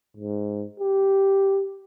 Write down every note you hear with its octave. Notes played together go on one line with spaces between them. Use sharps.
G#2
G4